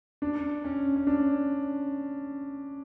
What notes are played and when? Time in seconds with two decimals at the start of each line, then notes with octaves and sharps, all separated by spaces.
0.22 D4
0.65 C#4
0.96 C#4
1.07 D4